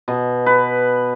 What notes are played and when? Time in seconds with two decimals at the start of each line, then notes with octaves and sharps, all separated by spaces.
0.08 B2
0.46 B4